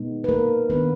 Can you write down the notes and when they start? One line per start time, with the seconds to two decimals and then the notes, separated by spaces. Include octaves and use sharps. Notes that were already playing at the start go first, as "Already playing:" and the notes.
Already playing: B2 G#3 B3 D#4
0.24 B4
0.29 A#3 A#4
0.70 D#3 A#3 B3 D4 B4